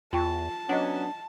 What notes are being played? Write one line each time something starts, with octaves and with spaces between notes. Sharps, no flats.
E2 F4 G5 A5 C#6
F#3 B3 C#4 D4 D#5 F#5